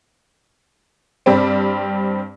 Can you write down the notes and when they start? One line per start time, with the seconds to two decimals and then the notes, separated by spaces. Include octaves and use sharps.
1.26 G2 G3 C4